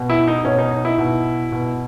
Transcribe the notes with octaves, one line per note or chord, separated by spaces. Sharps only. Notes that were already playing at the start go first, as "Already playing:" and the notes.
Already playing: B2
E4
D#4
B2 C#4
D#4
D#4
E4
B2
B2